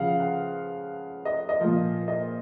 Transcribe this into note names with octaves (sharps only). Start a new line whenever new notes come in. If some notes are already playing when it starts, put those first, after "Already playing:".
Already playing: C#3 F3 F5 F#5
F#5
D#5
D#5
A#2 F3
D#5